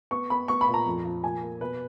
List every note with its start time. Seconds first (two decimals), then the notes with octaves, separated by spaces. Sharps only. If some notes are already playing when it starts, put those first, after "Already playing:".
0.11 B3 C#6
0.30 B3 B5
0.48 B3 C#6
0.61 B5
0.68 A#2
0.74 A#5
0.86 F2
1.05 F3
1.23 A#2 G#5
1.43 A#3
1.61 B2 B4